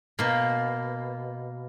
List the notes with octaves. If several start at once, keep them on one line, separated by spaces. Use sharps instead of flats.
B2 A#3